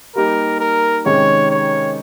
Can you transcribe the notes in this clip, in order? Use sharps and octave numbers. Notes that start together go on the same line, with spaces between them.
G3 A#3 D#4 G4 A#4
A#4
C3 D#3 G#3 C#4 G4 C#5
C#5